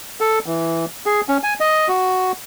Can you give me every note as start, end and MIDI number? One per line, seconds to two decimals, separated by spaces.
0.20 0.39 69
0.46 0.85 52
1.06 1.21 68
1.28 1.38 61
1.43 1.54 80
1.60 1.88 75
1.88 2.32 66